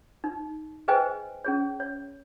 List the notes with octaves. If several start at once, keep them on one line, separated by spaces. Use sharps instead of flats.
D#4
G#4 B4 C5 D#5 G5 G#5
C#4 G#4 C#5
C#5